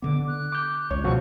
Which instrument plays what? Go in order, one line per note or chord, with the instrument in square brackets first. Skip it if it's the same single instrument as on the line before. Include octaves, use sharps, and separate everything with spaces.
[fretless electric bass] D3 B3 [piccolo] D6
[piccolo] F#6
[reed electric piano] D6 G6
[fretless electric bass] C#2 [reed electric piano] C#5
[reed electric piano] B2 F3 F#4 [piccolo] C#6